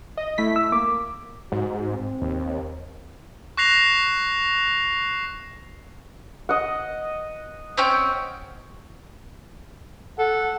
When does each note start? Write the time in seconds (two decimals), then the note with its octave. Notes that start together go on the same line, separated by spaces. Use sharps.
0.17 D#5
0.38 A3 E4 B6
0.56 E6
0.72 A#3 D6
1.52 G#2 F#4
1.91 C4
2.22 D#2
3.57 C#6 F#6 A#6 C7 F7
6.49 D#5 F#5
7.77 C4 C#4 G5
10.19 A4 F#5